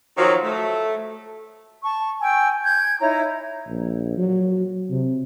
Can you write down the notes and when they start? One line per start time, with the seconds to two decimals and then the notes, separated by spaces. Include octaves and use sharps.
0.17 D#3 F3 F#3
0.43 A3
1.83 A5 C#6
2.20 G5 G#5 E6
2.64 G6 G#6
3.00 D#4 E4 C#5 A#5
3.68 A#1
4.17 F#3
4.90 C3